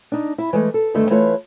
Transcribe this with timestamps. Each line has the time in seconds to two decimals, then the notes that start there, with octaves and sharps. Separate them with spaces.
0.12 D4 D#4
0.38 E4
0.53 E3 G#3 A3
0.74 A4
0.94 G2 D3 D#3 A3
1.10 E3 A3 E4 F4 B4 C#5